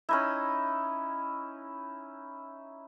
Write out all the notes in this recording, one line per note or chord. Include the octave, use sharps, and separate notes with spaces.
C#4 D#4 E4